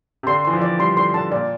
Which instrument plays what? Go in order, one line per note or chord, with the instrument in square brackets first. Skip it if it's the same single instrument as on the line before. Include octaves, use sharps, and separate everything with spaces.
[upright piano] C3
[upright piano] D3 [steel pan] C6
[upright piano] E3 [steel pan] C6
[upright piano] F3
[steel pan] D5
[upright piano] G3 [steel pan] C6
[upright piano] D3 [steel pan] C6
[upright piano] D3 [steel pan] A5
[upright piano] A#2 [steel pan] D5